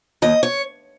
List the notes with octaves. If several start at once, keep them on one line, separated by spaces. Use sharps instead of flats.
D#2 D#5
C#5